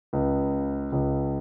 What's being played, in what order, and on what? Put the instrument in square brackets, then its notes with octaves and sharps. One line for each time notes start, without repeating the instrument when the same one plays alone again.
[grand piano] C#2 C#3
C#2 C#3